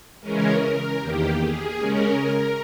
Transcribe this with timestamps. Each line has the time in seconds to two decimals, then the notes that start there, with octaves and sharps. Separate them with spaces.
0.21 C#3 E3 G#3 C#4 A#4
0.60 A#4
0.99 E2 D#3 A#3 G4
1.39 G#4
1.78 C#3 G#3 C#4 A#4